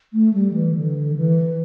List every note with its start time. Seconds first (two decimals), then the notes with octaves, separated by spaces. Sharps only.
0.13 A3
0.34 G3
0.54 E3
0.75 D3
1.16 E3